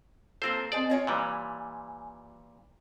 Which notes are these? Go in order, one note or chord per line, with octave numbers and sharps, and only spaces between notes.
A#3 C4 F4 A4 C5
C4 G#4 C5 D5 D#5 G#5
F4 C#5 D#5 G#5
A#2 E3 G3